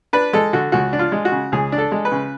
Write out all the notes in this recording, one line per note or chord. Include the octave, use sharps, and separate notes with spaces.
D4 B4
G#3 A4
D3 F#4
C#2 F#4
D4
F4
G#3
F#4
C#3
C#2 G#4
D4
A4
G#3
B4
C#3